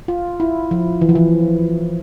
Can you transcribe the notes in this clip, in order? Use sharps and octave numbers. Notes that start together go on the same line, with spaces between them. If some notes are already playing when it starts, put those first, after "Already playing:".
F4
E4
F3
E3
F3
E3